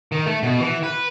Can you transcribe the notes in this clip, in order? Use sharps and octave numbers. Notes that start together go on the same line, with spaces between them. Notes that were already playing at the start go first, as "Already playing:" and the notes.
D#3
A3
B2
E3
B4